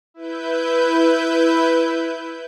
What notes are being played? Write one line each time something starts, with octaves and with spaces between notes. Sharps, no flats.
E4 B4 G6